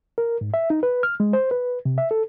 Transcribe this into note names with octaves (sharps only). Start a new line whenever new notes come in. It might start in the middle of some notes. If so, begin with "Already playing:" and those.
A#4
G#2
E5
D#4
B4
F6
G#3
C5
B4
C3
E5
A4